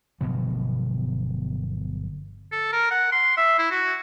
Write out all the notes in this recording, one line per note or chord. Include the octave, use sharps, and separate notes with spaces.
G1 B2 F3 F#3
A4
A#4
F#5
C6
E5
E4
F#4